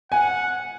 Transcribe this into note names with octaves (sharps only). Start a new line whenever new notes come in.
F#5 G#5